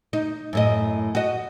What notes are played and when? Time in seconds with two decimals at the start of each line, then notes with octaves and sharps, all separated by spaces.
0.13 D#4
0.53 F#2 A2 D#5
1.15 F#4 D#5